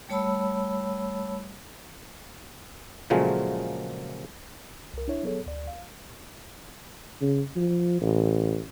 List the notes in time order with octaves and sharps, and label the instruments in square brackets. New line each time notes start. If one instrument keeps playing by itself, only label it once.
[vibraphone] G3 A3 C#5 A5 B5 E6
[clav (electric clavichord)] A#2 C#3 F3 F#3 G#3 A3
[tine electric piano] C2 A#4
D4 E4 C#5 E5
F#3 B3 G#4 A4 C#5
D2 D5
F5
[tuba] C#3
F3
A1